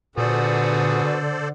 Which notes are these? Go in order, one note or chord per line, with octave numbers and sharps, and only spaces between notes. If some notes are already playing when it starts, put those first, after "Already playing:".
A#2 D3 B3 F#4 G#4 A4 C5 D5